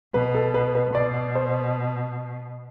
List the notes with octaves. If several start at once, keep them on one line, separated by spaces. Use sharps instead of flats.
B2 B4
A4
B4
B4
B2 D5
C5